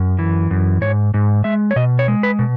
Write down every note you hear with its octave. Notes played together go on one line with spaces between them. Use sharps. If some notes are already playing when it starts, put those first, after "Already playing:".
Already playing: F#2
E3
F#2
G#2 C#5
G#2
G#3 E5
C#5
B2 D#5
C#5
G#3
B4
B2